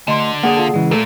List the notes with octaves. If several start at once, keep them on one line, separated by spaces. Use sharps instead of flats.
D2 D3 D#5 C6
A#3 G#4 D5 F#5
F4 A4
C#3 E3 G#3
A#2 A3 A4 A#4